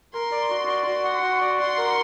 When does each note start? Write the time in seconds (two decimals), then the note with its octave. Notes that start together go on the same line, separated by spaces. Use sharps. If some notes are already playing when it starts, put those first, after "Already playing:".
0.14 A#4 C6
0.32 D5
0.50 F#4
0.68 D5
0.86 F#4 C6
1.04 F#5
1.23 F#4
1.41 D5
1.59 F#5 C6
1.78 A#4